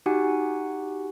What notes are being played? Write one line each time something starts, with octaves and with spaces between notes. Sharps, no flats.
D#4 F#4 G4 F#5 G#5